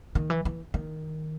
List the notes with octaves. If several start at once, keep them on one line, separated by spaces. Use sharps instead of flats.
D#3
E3
E3
D#3